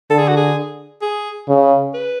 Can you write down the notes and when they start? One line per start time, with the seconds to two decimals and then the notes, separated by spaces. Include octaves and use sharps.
0.10 D3 A4
0.19 G#4
0.28 F#4
0.37 G#4
1.02 G#4
1.48 C#3
1.94 B4